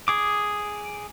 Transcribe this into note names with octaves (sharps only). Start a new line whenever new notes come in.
G#4 D6